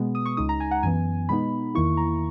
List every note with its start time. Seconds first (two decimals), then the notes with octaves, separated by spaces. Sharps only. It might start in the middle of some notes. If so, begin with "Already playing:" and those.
Already playing: B2 G#3 B3
0.15 D#6
0.25 C#6
0.37 C#2 C#3 G#3 D#4 D#6
0.49 A#5
0.60 G#5
0.71 F#5
0.83 F#2 E3 B3 G#5
1.29 B2 G#3 B3 D#4 B5
1.75 E2 D#3 A#3 E4 C#6
1.97 A#5